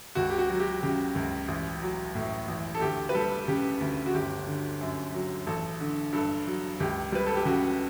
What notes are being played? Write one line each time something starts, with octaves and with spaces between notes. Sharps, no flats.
C#2 F#4
G4
F#4
F#3
G4
C#3 G4
C#2
A1
F#3
A2
A1
A4
D2 G4
B4
G3 A4
C#3 G4
D2
F#4
G1 G4
D3
F#2
F#3
A1 A4
D3
G2 A4
F#3
C#2 G4
G3 B4
A4
G4
C#3 F#4